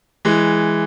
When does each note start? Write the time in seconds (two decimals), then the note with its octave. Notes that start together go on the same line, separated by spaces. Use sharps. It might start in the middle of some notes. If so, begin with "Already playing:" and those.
0.25 E3 G#3